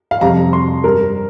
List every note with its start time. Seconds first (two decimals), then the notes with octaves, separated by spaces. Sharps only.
0.11 F5
0.21 F2 C3 G3 A#5
0.53 C6
0.84 G2 G3 A#4